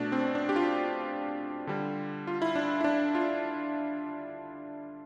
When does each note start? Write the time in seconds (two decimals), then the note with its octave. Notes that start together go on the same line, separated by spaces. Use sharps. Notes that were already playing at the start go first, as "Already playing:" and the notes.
Already playing: B2 A3 D4
0.12 C4
0.35 D4
0.49 G4
0.56 F4
1.67 D3 G3
2.27 F4
2.42 E4
2.56 D4
2.81 E4
2.84 D4
3.15 F4